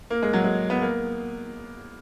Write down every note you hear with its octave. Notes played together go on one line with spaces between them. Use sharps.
A#3
G#3
F#3
G#3
B3
A#3